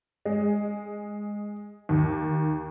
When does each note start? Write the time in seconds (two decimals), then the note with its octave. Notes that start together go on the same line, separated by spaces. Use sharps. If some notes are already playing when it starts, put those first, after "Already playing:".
0.25 G#3
1.89 D#2